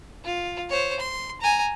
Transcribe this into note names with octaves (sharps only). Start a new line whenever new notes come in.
F4
C5 C#5
C6
G#5 A#5